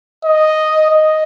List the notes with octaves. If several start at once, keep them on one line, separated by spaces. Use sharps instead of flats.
D#5
D#5